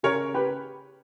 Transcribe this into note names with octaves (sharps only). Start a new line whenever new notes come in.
C#3 A#4 C#5
G4 B4